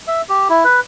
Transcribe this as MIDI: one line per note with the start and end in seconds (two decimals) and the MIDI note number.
0.07 0.22 76
0.29 0.48 67
0.49 0.64 64
0.64 0.80 71